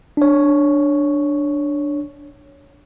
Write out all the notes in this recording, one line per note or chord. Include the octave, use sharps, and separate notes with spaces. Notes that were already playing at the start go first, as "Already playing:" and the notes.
D4 C#5